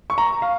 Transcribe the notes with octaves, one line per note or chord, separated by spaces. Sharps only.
C#6
A#5
F5